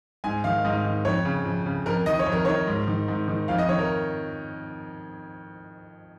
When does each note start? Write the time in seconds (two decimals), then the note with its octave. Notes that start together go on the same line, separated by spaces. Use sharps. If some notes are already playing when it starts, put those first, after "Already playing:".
0.24 G#2 G#5
0.44 D#3 F5
0.65 G#2 D#5
0.84 D#3
1.05 F2 C#5
1.25 C#3
1.45 F2
1.66 C#3
1.86 F2 A#4
2.06 D#3 D#5
2.19 C#5
2.26 F2
2.32 A#4
2.45 D#3 C#5
2.67 G#2
2.87 D#3
3.08 G#2
3.28 D#3
3.48 F2 F5
3.58 D#5
3.68 D#3 C#5
3.79 A#4